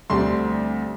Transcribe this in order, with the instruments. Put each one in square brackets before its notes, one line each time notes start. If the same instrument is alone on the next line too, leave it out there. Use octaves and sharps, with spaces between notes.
[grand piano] D2 D3 G3 C4 C6